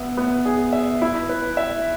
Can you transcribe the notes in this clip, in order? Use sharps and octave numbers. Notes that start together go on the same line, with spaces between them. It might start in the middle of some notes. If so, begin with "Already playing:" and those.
Already playing: B3 E5
B3
G#4
E5
E4
B4
E5